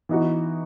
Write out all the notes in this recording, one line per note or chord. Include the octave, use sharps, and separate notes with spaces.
E3 B3 D#4 F#4